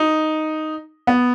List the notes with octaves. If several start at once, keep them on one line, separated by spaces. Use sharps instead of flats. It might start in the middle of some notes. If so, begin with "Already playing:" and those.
Already playing: D#4
B3